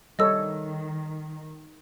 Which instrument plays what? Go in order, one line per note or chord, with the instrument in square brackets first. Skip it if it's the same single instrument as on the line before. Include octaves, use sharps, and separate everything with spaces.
[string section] D#3 [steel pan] G3 A4 C#5 [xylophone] D#5 E6